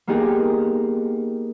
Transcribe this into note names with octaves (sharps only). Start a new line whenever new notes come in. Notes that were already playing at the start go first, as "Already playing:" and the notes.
A#3 B3 D#4 G4 G#4 A#4